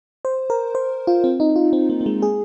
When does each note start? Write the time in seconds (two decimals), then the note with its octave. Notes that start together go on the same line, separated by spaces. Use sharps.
0.25 C5
0.50 A#4
0.75 C5
1.07 F4
1.24 C4
1.40 D#4
1.56 F4
1.73 C4
1.90 A#3
2.01 A#3
2.06 G#3
2.22 G#4